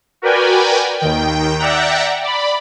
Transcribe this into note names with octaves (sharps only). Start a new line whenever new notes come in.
F#4 A#4 B4 D5 G5 G#5
D#2 D#3 G5
D5 E5 F#5 G5 A#5
D5 B5